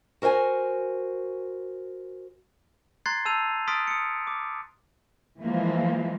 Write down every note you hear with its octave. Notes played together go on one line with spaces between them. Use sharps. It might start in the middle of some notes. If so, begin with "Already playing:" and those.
F#4 A#4 C5 G5 G#5
A#5 C6 F#6 G#6 A6 C7
A5 E6 G6 D#7 F7
C6 D#6 F6 A6 B6 D7
D#6 C#7
D6
E3 F3 G#3 A#3